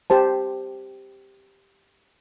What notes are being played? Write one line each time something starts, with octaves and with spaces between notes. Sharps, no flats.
G4 C5 A5